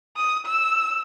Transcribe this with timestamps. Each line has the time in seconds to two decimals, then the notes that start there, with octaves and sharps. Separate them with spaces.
0.17 D#6
0.46 E6